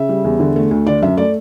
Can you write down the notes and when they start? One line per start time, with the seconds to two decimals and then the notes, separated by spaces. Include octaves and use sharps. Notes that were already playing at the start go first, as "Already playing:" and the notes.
Already playing: C#3 E5
0.09 G3
0.24 E2
0.40 D3
0.56 A3
0.71 D2
0.87 D3 D5
1.02 F#2 E5
1.17 A3 D5